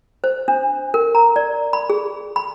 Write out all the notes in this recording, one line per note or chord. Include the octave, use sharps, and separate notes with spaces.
C5
D4
A#4
A#5
D5
B5
G#4
B5